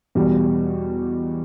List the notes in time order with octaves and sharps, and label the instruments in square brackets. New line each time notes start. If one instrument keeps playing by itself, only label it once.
[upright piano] E2 B2 G3